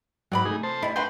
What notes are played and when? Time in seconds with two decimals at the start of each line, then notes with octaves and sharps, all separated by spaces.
0.32 G#2 F#3 C4 C5 D5 B5
0.45 C3 A3 D#4 G#4
0.63 C5 A5
0.83 G3 E4 D#5
0.96 D3 F#4 B4 E5 F5 G5 C6